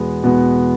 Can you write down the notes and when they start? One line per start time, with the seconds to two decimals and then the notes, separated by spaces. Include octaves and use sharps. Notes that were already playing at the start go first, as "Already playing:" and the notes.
Already playing: E2 B2 G#3 B3
0.23 E2 B2 G#3 B3